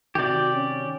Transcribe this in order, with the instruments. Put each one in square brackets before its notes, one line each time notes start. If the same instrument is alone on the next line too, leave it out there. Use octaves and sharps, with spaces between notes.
[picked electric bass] C3 D#3 [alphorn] F#4 [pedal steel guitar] G4 D5
[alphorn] C#4